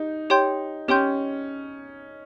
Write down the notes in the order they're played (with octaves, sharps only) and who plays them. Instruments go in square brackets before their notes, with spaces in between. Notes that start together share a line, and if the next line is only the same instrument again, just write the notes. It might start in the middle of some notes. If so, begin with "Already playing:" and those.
Already playing: [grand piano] D#4 [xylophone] G4
[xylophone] G4 C#5 G5 C6 G6
[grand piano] C#4 [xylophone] G4 C#5 G5 C6 G6